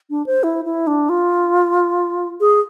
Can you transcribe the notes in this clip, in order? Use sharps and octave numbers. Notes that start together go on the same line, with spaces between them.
D4
C5
E4
E4
D4
F4
G#4